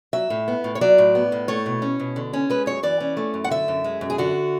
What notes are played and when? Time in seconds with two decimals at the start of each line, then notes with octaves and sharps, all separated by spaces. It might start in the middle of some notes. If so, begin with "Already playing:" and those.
0.13 F#3 E5
0.30 A2
0.48 B3
0.64 A2
0.75 C#5
0.81 F#3 D5
0.98 A2
1.15 B3
1.32 A2
1.48 A3 C#5
1.66 B2
1.82 C#4
2.00 B2
2.16 D3
2.33 C#4
2.50 G#3 B4
2.66 F#2 C#5
2.83 E3 D5
3.00 C#4
3.17 A3
3.34 F#2
3.44 F#5
3.50 D3 E5
3.68 F#2
3.84 G#3
4.01 F#2
4.10 G#4
4.18 D3 F#4